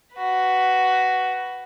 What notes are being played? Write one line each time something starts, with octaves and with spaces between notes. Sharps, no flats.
F#4 B4